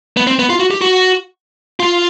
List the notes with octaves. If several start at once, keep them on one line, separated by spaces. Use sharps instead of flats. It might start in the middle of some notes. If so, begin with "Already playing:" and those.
B3
C4
B3
F4
F#4
G4
F#4
F4